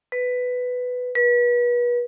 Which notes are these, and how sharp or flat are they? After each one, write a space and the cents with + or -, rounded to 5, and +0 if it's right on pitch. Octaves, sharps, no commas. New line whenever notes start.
B4 +10
B4 -35